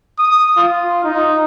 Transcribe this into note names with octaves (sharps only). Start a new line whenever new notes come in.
D#6
F4
D#4